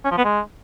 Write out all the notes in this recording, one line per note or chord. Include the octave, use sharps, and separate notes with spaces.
C#4
F3
B3
G#3